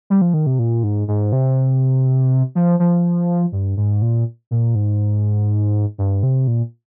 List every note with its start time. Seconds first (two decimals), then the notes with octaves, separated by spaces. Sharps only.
0.10 G3
0.21 F3
0.34 D#3
0.46 C3
0.59 A#2
0.83 G#2
1.08 G#2
1.32 C3
2.55 F3
2.80 F3
3.52 G2
3.77 G#2
4.02 A#2
4.51 A#2
4.75 G#2
5.98 G2
6.23 C3
6.47 A#2